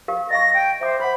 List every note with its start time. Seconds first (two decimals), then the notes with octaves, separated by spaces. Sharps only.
0.08 G4 A#4 F5
0.30 D#5 F5 C#6 A#6
0.54 G5
0.81 C5 E5 D6
1.00 C5 F#5 B5